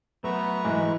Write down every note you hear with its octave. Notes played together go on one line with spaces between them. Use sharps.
F#3 A3 B3 B4 A#5 C#6
G#2 E3 G#3 E4